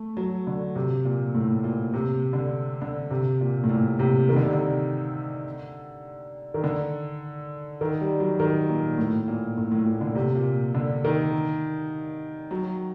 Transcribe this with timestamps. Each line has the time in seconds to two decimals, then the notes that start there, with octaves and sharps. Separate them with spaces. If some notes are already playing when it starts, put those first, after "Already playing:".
Already playing: A3
0.17 F#3
0.47 D3
0.76 C3
1.05 A#2
1.35 A2
1.64 A#2
1.94 C3
2.33 D3
2.82 D3
3.11 C3
3.41 A#2
3.64 A2
3.69 A#2
3.99 C3
4.29 D#3
4.36 D3
4.45 C3
4.53 D3
6.54 D#3
6.64 D3
7.81 D#3
8.01 G3
8.20 F#3
8.40 D#3
8.68 A#2
8.98 A2
9.28 A#2
9.58 A2
9.72 A2
9.86 A#2
10.01 D3
10.15 C3
10.35 A#2
10.75 D3
11.04 D#3
12.51 F#3